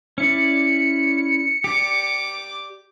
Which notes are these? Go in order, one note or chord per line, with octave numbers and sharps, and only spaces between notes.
C#4 E4 D5 C#7
G4 D5 D6